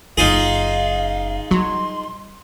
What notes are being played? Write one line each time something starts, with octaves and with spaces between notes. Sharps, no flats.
F#1 C#3 D#4 F4 G#4 F5
F#3 G3 C6